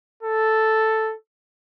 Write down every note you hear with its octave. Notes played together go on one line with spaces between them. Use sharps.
A4